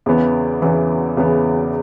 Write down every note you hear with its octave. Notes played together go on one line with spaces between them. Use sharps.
E2 C#3 E3 B3
E2 C#3 E3 B3
E2 C#3 E3 B3